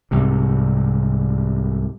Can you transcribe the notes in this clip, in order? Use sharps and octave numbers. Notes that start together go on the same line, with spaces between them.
C2 G#2 C3